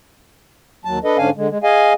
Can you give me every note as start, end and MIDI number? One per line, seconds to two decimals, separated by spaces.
0.85 0.99 39
0.85 0.99 54
0.85 0.99 81
1.04 1.17 62
1.04 1.17 69
1.04 1.17 71
1.04 1.17 75
1.18 1.30 44
1.18 1.30 50
1.18 1.30 61
1.18 1.30 62
1.18 1.30 77
1.18 1.30 80
1.36 1.49 50
1.36 1.49 56
1.49 1.58 56
1.63 1.93 68
1.63 1.93 75
1.63 1.93 77
1.63 1.93 80